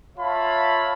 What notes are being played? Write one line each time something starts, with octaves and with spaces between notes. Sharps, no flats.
F4 C#5 E5 F5 A5 B5